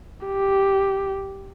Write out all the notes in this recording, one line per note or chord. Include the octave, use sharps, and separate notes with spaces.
G4